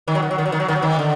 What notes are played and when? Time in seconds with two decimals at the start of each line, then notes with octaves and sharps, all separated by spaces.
0.08 D#3
0.15 F#3
0.22 D#3
0.31 F#3
0.38 D#3
0.45 F#3
0.52 D#3
0.60 F#3
0.68 D#3
0.76 F#3
0.82 D#3
0.99 D3